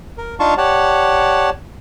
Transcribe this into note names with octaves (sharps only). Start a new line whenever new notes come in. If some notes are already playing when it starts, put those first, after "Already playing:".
A#4
D4 D#4 F4 F5 A5 C#6
G4 C#5 D5 F#5 A5